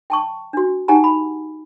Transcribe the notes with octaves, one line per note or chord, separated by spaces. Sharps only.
G5 A5 C#6
D4 F#4
D#4 G4 F#5 G#5 A#5
B5